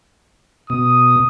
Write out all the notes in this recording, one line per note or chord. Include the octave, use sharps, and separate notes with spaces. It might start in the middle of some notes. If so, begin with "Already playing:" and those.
B2 D#6